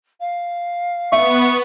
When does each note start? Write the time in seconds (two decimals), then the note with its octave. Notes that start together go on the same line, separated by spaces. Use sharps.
0.20 F5
1.12 B3 E5 C#6